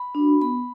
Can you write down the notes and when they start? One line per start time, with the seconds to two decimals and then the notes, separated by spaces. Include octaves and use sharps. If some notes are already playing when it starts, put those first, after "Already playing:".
Already playing: B5
0.15 D4 F#4
0.41 B3 B5